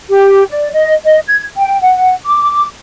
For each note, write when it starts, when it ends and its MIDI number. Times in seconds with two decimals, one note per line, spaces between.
0.10 0.44 67
0.50 0.69 74
0.73 0.93 75
1.05 1.19 75
1.27 1.46 92
1.58 1.80 79
1.81 2.14 78
2.25 2.66 86